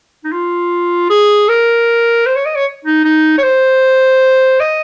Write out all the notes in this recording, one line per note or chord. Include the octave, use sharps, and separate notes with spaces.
D#4
F4
G#4
A#4
C5
C#5
D#5
C#5
D#4
D#4
C#5
C5
D#5